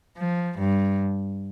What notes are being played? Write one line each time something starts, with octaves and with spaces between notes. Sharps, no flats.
F3
G2